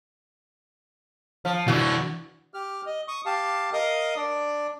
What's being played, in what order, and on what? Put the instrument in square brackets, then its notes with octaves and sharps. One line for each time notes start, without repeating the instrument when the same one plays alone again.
[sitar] F3
[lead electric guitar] E3 D4 [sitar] F#4
[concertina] G4 F6
D#5
C#6 D#6
G4 F5 A5
A#4 D#5 F5 D#6
D4 D5